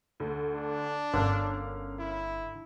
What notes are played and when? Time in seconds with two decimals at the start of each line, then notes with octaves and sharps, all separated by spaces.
0.20 D2 D3
0.55 D4
1.14 G1 D3 C#4 A#4 F5
1.99 E4